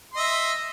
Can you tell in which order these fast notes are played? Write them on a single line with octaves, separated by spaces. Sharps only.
C6 D#5 E5